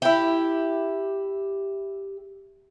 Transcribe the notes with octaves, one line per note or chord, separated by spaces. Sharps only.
E4 G4